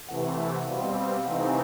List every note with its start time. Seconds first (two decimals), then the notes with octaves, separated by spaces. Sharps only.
0.09 C3 E3 A3 F#5
0.37 E5
0.56 F#5
0.67 B2 G3 C4 F5
0.96 F5
1.16 F5
1.25 C3 E3 A3 C4 D#4 F#5
1.48 G#5